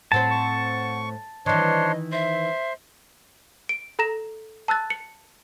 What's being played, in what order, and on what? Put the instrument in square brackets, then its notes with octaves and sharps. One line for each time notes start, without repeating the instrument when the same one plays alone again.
[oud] A2 C4 C5 [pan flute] F#5 [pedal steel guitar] A5
[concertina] C#6
[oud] D#3 E3 [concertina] D4 C5 C#5 [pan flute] D#5
[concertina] C5 [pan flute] E5
[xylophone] D7
A4 A#5 A#6 E7
A5 E6 F#6 A6
C#7